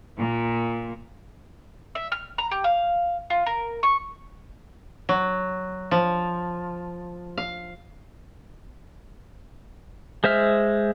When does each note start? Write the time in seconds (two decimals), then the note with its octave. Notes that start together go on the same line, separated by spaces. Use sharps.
0.18 A#2
1.95 E5
2.12 F6
2.38 A#5
2.51 G4
2.64 F5
3.30 F4
3.46 A#4
3.83 C#6
5.09 F#3
5.91 F3
7.38 F5
10.24 G#3 C5 E5 F6